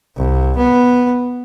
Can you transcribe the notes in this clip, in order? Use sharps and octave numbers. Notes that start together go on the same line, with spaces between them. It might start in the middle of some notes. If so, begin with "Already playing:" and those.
C2
B3